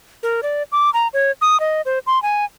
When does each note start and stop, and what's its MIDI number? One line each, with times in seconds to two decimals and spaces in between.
0.23 0.41 70
0.43 0.63 74
0.72 0.90 86
0.94 1.08 82
1.13 1.31 73
1.41 1.60 87
1.60 1.81 75
1.85 1.99 72
2.07 2.21 84
2.22 2.45 80